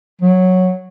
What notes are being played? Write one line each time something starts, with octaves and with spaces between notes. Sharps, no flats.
F#3